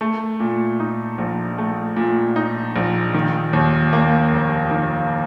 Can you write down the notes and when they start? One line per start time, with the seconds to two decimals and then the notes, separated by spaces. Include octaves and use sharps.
0.01 A3
0.40 A#2
0.80 D#4
1.18 A#1
1.58 A3
1.97 A#2
2.36 D#4
2.76 A#1
3.14 D#3
3.53 D#2
3.93 A#3
4.32 F1
4.71 D#3